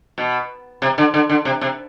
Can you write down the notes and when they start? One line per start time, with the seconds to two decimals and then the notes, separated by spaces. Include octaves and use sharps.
0.18 B2
0.82 C3
0.98 D3
1.14 D3
1.29 D3
1.45 C3
1.61 C3